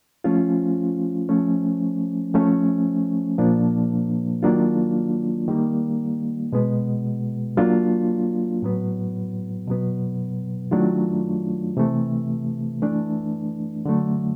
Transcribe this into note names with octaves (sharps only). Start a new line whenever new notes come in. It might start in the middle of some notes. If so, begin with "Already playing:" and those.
F3 A3 C#4 F4
F3 A3 C#4
F3 A3 C#4
A#2 F3 A#3 D4
D#3 F#3 A#3 D4 F4
D#3 G3 A#3
B2 G#3 B3
F#3 A#3 D4 F4
A2 F#3 B3
B2 F#3 B3
D#3 F#3 A3 D4 F4
C3 E3 A3
E3 A3 D4
D3 F#3 A3